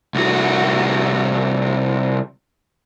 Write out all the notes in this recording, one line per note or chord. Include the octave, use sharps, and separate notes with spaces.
C2 F#4